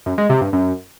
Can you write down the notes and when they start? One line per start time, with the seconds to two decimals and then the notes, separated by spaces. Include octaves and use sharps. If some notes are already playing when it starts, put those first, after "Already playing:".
0.06 F#2
0.18 G#3
0.30 C3
0.41 G2
0.53 F#2